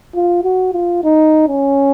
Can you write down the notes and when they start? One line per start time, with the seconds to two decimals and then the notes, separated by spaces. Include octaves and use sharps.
0.15 F4
0.44 F#4
0.73 F4
1.03 D#4
1.48 C#4